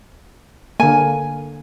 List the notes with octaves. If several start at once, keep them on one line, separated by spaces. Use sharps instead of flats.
D3 A#3 G#5